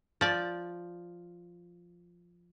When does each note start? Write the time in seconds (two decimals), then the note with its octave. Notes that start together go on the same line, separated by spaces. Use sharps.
0.21 F3 D5